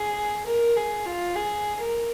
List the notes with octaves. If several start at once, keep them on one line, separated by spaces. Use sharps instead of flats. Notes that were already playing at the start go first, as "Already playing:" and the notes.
Already playing: G#4
A#4
G#4
F4
G#4
A#4